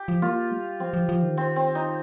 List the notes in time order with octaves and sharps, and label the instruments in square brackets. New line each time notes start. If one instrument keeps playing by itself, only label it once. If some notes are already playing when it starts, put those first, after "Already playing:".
Already playing: [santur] G4
[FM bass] F3
[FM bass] A#3 [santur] F4
[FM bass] G3
[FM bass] F3 [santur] C4
[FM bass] F3
F3
D#3
[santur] C4
C4
D#4